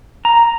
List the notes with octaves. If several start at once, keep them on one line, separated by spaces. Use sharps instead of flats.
A#5